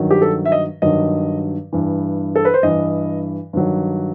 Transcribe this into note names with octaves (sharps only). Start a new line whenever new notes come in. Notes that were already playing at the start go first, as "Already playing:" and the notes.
Already playing: G2 D#3 F#3
G4
A4
E5
D#5
G2 D#3 F#3 D#5
G2 E3
A4
B4
C5
G2 E3 D#5
G2 D#3 F#3